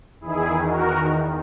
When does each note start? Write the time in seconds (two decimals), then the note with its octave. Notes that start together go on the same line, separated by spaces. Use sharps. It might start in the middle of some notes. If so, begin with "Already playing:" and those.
0.21 E2 D#3 E4 G#4
0.66 F#4 A#4